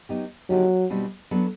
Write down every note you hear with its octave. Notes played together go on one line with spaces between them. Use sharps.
F#3 B3 D#4 G4
D3 F3 F#3 A#3 D#4 G4
B2 G3 C4 D#4 F#4
F#3 B3 D4 F#4 A4